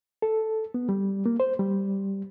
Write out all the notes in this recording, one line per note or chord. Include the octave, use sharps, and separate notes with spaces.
A4
B3
G3
A#3
C5
G3